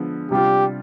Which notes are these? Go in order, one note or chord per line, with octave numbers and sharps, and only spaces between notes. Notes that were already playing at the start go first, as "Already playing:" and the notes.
Already playing: D3 F3 G#3 B3
C3 G3 D4 F4 G4